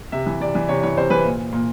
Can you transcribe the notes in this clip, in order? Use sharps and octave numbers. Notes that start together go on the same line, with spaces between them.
C3 E5
E3
C3 D5
E3
C3 C#5
E3 C#5
C3 C5
E3 B4
A#2
A#2